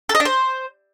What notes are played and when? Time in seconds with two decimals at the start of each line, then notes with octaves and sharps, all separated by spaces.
0.09 A4
0.15 D#5
0.20 D4
0.25 C5